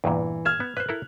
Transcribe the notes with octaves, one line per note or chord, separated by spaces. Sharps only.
E2 G2 A#2 E3
F6 G#6 E7
B3
B4 C5 F#6
E4 A4 A#4